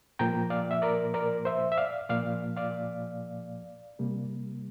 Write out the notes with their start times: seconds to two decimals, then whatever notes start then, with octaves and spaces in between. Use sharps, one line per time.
0.19 A#2 F3 A#3 G5 A#5
0.50 D5 F5
0.71 E5
0.82 A#4 D5
1.14 A#4 D5
1.45 C5 E5
1.72 E5
1.78 D5 F5
2.09 A#2 F3 A#3 D5 F5
2.57 D5 F5
3.99 C3 G3 A#3